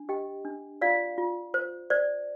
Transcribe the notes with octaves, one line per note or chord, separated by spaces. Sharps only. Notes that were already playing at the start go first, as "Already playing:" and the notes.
Already playing: D4
G4 D#5 G5
D4
F4 D5 F5
F4
C5
C5 D5